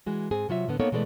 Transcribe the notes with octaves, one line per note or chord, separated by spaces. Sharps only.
E3 G#3 F#4
G#2 C4 G#4
C3 F#3 F4 E5
A2 D3 B3
A#3 B3 D#4 A4 C#5
B2 E3 G#3 A3 D5